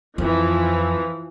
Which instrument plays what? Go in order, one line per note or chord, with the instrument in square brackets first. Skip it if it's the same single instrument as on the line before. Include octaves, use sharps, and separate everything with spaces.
[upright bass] F2 [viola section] E3 F3